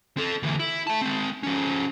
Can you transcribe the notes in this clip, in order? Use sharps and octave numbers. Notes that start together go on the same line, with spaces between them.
C4 A4
D2 E3
E4
E5 A5
G#3 C4
F3 C#4